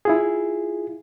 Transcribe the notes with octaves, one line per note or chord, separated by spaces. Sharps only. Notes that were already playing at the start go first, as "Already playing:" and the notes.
E4 F4 G#4